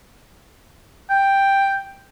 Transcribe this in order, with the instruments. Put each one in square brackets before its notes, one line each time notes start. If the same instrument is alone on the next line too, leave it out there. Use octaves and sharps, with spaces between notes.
[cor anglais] G5